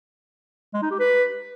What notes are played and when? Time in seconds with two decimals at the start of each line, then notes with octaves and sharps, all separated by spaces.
0.74 G#3
0.82 D#4
0.91 G4
0.99 B4